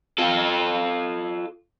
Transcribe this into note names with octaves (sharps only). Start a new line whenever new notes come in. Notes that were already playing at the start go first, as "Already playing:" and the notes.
F4 A4